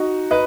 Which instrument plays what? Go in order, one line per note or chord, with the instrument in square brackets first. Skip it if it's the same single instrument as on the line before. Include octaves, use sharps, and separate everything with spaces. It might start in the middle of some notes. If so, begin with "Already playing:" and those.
Already playing: [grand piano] D#4 F#4
B4 D#5